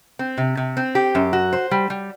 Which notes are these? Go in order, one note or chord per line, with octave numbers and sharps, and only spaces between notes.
C4
C3
C3
C4
G4
F#2
F#4
C5
G3
G3